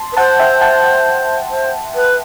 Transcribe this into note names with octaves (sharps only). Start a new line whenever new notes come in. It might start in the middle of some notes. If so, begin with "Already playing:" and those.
Already playing: A5 C6
B4
C5 F#5 A5
E5 G5
F#5 A5
C5
B4